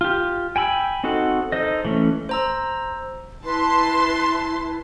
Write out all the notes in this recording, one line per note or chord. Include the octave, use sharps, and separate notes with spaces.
F4 G4
G5 G#5 B5 E6
C4 D#4 F#4 A4 F#5
D#4 A4 C5 D#5
E3 A3 C#4
C5 A#5 E6
E4 B4 A5 C6